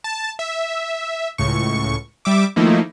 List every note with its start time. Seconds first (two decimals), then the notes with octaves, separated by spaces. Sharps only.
0.04 A5
0.39 E5
1.38 C#2 A2 C#6
2.25 G3 E5 D6
2.56 D#3 F3 A3 A#3 D#4 E4